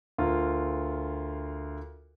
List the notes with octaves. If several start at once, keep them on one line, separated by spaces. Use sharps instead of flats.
D2 F4 A#4